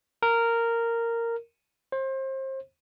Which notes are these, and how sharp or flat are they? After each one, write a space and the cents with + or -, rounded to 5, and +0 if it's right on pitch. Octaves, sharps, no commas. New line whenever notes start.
A#4 -10
C5 +30